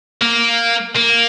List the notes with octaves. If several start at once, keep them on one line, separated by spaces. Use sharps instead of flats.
A#3
A#3